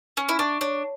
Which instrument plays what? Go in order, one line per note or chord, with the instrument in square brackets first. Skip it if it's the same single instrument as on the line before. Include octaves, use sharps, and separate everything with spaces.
[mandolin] C#4 [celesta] C#6
[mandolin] E4
[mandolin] D4 [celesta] C#6
[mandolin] D4 [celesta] C#5